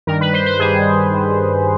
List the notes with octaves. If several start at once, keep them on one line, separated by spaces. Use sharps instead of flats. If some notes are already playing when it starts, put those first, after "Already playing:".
G2 D#3 G3 A#4
B4
C5
C5
G2 D#3 G3 G#4
G2 D#3 G3